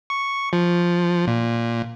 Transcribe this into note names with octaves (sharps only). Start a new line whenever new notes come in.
C#6
F3
A#2